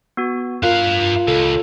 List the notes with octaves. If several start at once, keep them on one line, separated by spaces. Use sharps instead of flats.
B3 F#4
G2 F4 A#4 F5 F#6
C#2 A4